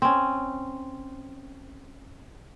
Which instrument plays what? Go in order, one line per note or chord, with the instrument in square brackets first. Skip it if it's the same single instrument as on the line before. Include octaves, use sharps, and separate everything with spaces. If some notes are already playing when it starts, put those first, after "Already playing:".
[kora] C4 C#4